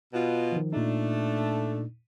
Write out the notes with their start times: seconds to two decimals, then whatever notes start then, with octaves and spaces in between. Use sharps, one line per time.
0.14 B2 F4
0.52 D#3 F3
0.72 A#2 A3 D4 D#4